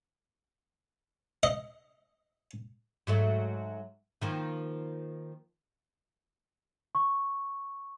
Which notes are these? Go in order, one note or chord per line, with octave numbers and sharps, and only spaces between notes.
D#5
G#2 F#3 A3
D#3 F3 A#3
C#6